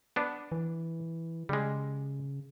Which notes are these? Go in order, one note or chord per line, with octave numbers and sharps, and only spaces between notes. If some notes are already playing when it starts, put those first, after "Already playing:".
B3 D4
E3
C#3 G3 G#3